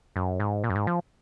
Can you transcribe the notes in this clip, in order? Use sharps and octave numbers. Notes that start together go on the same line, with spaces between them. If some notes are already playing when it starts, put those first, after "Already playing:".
F#2
G#2
A#2
F#2
G#2
F3